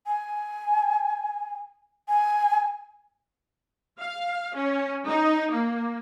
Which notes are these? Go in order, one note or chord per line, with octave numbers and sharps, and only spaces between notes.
G#5
G#5
F5
C#4
D#4
A#3